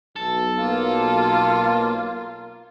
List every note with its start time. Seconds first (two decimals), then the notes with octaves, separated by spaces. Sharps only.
0.16 B1 A4
0.59 A#3 F4